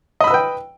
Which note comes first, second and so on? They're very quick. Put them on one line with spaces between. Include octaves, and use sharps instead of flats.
D#5 B5 E6 B4 G5